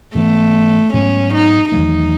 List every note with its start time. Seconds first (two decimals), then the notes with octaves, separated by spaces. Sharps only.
0.15 G#2 E3 A3 B3
0.93 G#2 F#3 B3 C#4
1.34 D#4
1.72 E2 D#3 F#3 A3 D#4